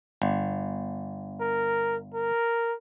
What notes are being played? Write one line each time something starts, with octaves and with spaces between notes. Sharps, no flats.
G1
A#4
A#4